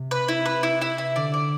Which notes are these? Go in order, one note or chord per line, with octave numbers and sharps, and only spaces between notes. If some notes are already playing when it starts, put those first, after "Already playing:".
Already playing: C3
B4
E4
B4
E4
E4
E4
D3 D5
D5